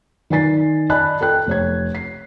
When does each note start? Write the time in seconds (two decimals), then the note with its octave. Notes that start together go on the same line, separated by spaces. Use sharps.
0.30 D#3 D5 G#5 A6 C7
0.89 D5 D#5 G#5 A5 B5 F#6
1.21 A4 G5 F#6
1.47 F1 C#5 G#6
1.95 C7